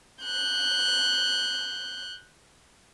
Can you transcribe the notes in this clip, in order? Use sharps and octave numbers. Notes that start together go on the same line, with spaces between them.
F#6 G6